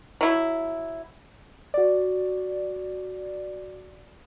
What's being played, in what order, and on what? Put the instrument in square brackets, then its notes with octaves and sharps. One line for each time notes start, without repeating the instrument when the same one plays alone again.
[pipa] F#3 E4
[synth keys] F#4 D5